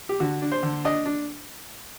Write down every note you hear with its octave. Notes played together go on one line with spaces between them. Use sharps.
G4
D3 F#4
D4
C5
D3
D4 D#5
D4